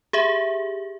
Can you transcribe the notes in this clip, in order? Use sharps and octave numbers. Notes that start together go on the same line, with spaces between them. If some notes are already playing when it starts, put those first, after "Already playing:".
G4 G#4 E5